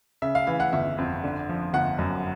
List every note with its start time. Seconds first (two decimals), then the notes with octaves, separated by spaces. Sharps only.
0.22 C#3 E5
0.35 F5
0.47 E3 F5
0.60 F#5
0.73 G1 E5
0.98 F2
1.24 D3
1.49 F3
1.73 G1 F#5
1.99 F#2